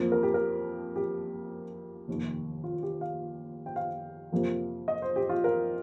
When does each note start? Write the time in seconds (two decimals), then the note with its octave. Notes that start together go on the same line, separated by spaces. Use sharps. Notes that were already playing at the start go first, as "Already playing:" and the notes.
Already playing: F2 F3 A#3
0.12 A#4
0.23 G4
0.34 A#4
0.96 G4
2.08 F1 D#2 D#3
2.64 F4
2.83 G4
3.01 F5
3.66 G5
3.76 F5
4.32 F2 C3 F3 A#3
4.88 D#5
5.02 C5
5.16 G4
5.29 F4
5.44 A#4